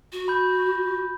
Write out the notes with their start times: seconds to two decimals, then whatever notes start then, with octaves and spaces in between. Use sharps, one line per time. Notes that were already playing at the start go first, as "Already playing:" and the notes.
0.12 F#4
0.28 B5 G6